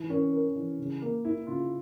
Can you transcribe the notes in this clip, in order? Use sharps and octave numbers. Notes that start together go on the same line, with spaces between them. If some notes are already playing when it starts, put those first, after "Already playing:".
Already playing: E3
C#4 A#4
A#4
E3
C#3
A#3
A#3 E4
C#3 F4